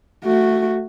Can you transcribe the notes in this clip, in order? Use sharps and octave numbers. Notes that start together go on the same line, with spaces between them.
A3 F#4